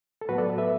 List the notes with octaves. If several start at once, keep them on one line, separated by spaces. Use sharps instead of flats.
A4
A2 F#3 B3 F#4 B4
A4 D5
B4 E5